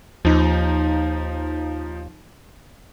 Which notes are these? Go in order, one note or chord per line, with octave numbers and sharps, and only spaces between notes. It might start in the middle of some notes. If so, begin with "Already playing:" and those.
D#2 F3 D#4